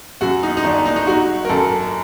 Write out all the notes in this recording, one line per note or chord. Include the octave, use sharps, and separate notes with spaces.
F#2 F#4
D#4
D#4
G1 D4
D#4
D#4
F#3 F#4
A#4
F#2 A4